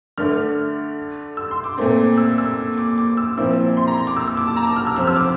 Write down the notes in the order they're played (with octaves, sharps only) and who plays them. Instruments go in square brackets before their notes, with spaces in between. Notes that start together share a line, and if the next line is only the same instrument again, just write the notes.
[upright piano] D3 A3 D4 [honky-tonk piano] F6
[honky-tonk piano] E6
C6
D6
[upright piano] A#2 A3 C4
[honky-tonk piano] E6
E6
D6
D6
E6
[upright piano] A#2 F3 C4 E4 [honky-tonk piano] E6
[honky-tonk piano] C6
A#5
D6
E6
E6
D6
A5
A#5
D6
F6
E6
[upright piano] C3 F3 C4 [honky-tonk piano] F6
[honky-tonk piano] E6
D6